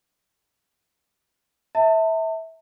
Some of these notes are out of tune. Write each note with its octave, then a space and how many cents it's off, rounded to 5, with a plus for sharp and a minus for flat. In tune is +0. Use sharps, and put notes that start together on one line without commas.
E5 -25 A5 +40